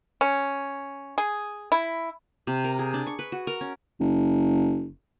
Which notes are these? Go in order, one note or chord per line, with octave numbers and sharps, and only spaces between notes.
C#4
G#4
E4
C3
A#4
G#4
D4
C#6
B4
F#4
A#4
C#4
F#1